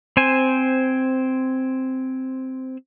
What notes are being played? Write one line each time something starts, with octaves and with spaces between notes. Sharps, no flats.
C4 C5 G#5